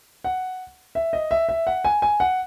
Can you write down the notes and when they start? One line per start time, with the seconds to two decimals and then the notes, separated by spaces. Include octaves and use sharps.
0.24 F#5
0.95 E5
1.13 D#5
1.31 E5
1.49 E5
1.67 F#5
1.85 G#5
2.02 G#5
2.20 F#5